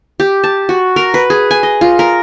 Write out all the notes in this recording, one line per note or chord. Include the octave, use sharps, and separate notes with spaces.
G4
A5
F#4
A#4
B4
G#4
G#5
D#5
F4
A#4